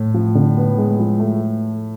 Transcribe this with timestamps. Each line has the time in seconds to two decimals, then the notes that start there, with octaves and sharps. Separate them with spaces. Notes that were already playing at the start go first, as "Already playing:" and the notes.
Already playing: A2
0.14 F3
0.35 D3
0.57 B3
0.78 G#3
0.99 F3
1.20 A3